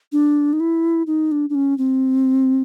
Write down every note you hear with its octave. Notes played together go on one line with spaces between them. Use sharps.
D4
D#4
E4
D#4
D4
D4
C#4
C4